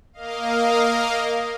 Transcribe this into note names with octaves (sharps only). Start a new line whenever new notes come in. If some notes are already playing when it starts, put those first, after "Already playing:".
A#3 A#4 D#5 F5